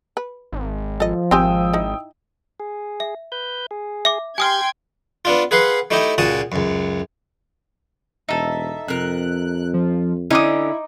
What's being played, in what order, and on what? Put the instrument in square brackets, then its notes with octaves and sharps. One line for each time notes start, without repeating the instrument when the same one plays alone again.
[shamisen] B4
[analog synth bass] G#1
[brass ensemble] F3 [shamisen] A4 D#5
[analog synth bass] G#1 [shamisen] C4 G4 G#5 [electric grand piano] G5 D#6 E6
[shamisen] D#4 E4
[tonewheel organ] G#4
[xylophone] E5
[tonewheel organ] B4 G6
G#4
[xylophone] E5 D6
[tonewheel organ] G4 [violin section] G5 C6 G#6 [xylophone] G#5 D#6 F6
[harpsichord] B3 D4 F4
G#4 B4 F5 F#5 C6
A3 D#4 E4 G4 D#5
C#2 A#2 F#4 A5 D#6
C#2 F#2
[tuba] E1 [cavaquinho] D#4 A4 [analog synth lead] E5
[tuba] F2 [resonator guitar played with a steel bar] C3 A#4 [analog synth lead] F#6
[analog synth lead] F3
[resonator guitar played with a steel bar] D3 C#4 [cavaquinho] D#4 D6 D#6 [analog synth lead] E4